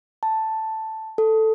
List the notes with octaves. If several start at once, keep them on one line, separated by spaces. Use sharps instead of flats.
A5
A4